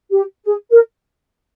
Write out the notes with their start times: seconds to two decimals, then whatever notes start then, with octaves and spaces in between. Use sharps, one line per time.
0.11 G4
0.45 G#4
0.71 A#4